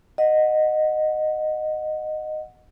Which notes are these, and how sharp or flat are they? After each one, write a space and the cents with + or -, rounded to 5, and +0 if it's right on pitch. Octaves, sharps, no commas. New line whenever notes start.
D#5 -10 F#5 -10